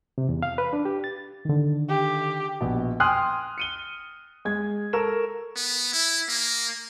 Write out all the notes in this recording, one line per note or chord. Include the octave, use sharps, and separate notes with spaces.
C3
E2
F5
B4
D4
G4
A6
D3 D#3
G4
A#1 B2
G5 G#5 C6 D#6 F6 F#6
C#7 D#7 G7
G#3 G#6
A4 A#4 C#6 E7
B3
E4
A#3